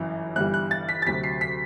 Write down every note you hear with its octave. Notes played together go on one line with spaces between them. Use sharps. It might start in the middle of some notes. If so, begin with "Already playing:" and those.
Already playing: G1 F#2 E3
G1 G2 E3 G3 F#6
F#6
A6
B6
A6
D2 C3 F#3 B6
C7
B6